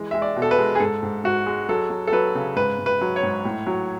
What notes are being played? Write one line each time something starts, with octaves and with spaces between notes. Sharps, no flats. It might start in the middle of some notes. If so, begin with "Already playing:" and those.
Already playing: E3 G#3
G#3 E5
D5
B2
A4
B4
G#3
G#4
G#2 A4
G#2
G#2 F#4
G#3
F#3 A4
F#3
A4
F#3 B4
C#3
G#2 B4
G#2
B4
F#3
C#5
G#2
A2
F#3